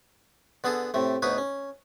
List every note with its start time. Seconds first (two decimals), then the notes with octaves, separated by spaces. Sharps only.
0.64 D3 B3 G#4 A4
0.94 A2 C3 A3
1.22 D2 B2 D#4 B4 C#5
1.38 C#4